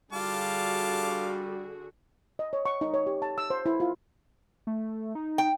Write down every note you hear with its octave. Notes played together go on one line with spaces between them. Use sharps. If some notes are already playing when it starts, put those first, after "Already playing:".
D3 G3 F4 F#4 G#4 F5 A5 D6
D#5
C#5
C#6
D#4
C#5
G4
A5
E6
C5
E4
F4
A3
D#4
G5